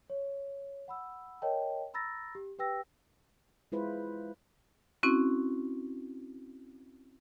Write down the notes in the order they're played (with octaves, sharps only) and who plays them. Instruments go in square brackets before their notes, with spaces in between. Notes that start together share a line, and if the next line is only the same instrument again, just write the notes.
[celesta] C#5
F#5 B5 E6
A#4 C#5 D#5 G5 A5
A#5 B5 E6 A6 A#6
G4
G4 B4 G5 E6 A#6
[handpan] G#3 E4 F4 B4 C5
[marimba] C4 C#4 E4 F#4